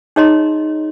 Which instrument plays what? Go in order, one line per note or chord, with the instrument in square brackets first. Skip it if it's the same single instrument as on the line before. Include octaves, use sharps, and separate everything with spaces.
[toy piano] D#4 G#4 C#5 D#5 A#5 C6